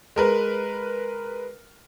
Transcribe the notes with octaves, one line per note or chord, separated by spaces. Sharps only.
G#3 A#4 B4